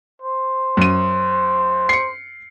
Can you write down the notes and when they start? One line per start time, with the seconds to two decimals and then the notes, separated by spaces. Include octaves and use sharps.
0.22 C5
0.77 F#2 D#7
1.89 C7 C#7